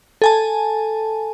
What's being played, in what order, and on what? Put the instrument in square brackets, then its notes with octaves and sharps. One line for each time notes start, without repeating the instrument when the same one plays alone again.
[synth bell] A4 G#5 A5